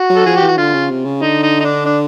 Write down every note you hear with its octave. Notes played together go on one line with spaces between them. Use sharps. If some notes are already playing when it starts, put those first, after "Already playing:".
Already playing: F#4
F#3
A4
F3 G#4
G4
E3
F#4
D3 F4
C#3
C3
C#3
D3 D#4
D#4
D#4
D4
D4